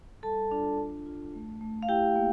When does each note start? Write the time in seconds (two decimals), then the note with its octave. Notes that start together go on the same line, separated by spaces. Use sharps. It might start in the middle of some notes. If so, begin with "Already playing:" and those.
0.23 G3 A4 A5
0.51 D4 F4 D5
0.78 D4
1.06 F4
1.34 A3
1.61 A3
1.83 F5
1.89 E4 G4 G5
2.16 A#3